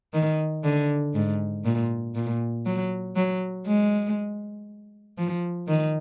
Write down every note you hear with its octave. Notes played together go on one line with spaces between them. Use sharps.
D#3
D3
G#2
A#2
A#2
F#3
F#3
G#3
F3
D#3